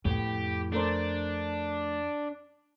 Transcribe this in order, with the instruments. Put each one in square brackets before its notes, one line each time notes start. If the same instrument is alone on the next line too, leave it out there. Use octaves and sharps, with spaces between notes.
[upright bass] F2 C#4 [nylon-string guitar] A2 B3 [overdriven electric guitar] G4
[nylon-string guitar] A3 A#4 C5 [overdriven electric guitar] D4